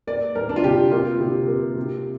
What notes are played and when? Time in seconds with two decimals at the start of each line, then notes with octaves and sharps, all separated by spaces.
0.07 A#3 D5
0.35 A#3 A#4
0.49 D4
0.56 F4
0.64 C3 G4
0.91 A#3 F4
1.20 C3
1.48 A#3
1.76 C3